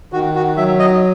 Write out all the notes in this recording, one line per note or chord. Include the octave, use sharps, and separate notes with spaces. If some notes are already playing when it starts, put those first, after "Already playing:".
D#3 F#4
F#4
F#3 E5
D#5